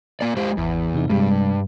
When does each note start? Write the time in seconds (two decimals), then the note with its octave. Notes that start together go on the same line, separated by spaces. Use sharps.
0.21 A#3 D5
0.37 G#3 G4 C5
0.57 G#1 E2
0.94 C3 D#4
1.10 G2 C3 G3 G#3